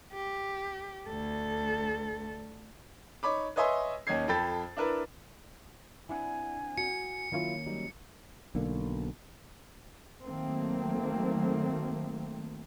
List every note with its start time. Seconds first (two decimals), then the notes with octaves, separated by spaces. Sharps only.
0.13 G4
1.08 D2 A4
3.23 D#4 C#5 B5 D6
3.56 B4 C#5 D#5 E5 G#5 C6
4.07 D#2 C#4 D#4 G#6 C7
4.28 F2 A4 G5 B5 A6
4.77 D4 E4 A#4 B4
6.09 C4 D4 E4 F#5 G#5
6.78 F#4 C#7
7.32 D#3 F#3 A#3 C#4 E4 F4
7.66 F#3 G3 D#4
8.55 B1 D3 A#3
10.25 D#3 F#3 A3 A#3 C4